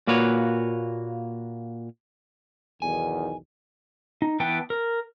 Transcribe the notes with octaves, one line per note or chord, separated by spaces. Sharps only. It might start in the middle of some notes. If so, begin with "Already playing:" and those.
A#2 A#3 F#4 B4 C#5
B1 E2 D#3 G#5
D#4
E3 B3 B4 G5 A5
A#4